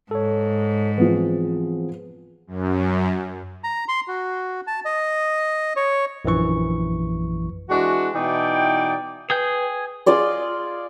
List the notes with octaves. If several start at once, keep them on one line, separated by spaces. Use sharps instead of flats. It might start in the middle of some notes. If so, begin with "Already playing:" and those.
G#2 A4 C#5
E3 F3 B3 C4 G#4
F#2
A#5
C6
F#4
A5
D#5
C#5
A#1 F#2 E3 C#6
E3 G#3 D4 F#4
B2 E3 D#4 E4 D5 G5
G#4 B4 G5 G6
F4 G#4 D5 D#5